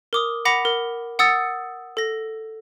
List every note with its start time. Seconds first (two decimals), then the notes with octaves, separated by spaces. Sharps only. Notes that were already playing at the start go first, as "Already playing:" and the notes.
0.13 A#4 D6 D#6
0.45 F#5 B5 D6 A#6 B6 F7
0.65 A#4
1.19 F#5 D#6 E6 A6 C#7
1.97 A4 A#6